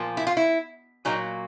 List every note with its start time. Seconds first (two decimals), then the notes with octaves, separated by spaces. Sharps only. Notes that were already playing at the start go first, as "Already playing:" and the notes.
Already playing: A#2 F3 A#3
0.17 E4
0.27 F4
0.37 E4
1.05 A#2 F#3 A#3 D#4